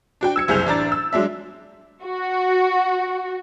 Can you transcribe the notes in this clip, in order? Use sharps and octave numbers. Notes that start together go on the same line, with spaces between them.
D4 F#4 G5
E6 G#6 C#7
F#1 C2 G#4 G6 F7
A1 D4 A#5 A6
E6
F#3 G#3 D4 E5
F#4